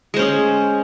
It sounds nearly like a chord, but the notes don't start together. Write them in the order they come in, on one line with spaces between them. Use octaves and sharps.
G#3 C5 C#4 G#4